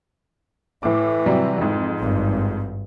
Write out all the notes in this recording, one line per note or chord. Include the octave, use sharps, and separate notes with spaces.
A2 E3 D6
C3 F#3 G3
F2 G#2
G#1 G2